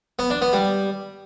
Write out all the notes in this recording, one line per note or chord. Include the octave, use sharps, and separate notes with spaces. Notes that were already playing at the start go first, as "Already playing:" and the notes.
B3
D4
B3
G3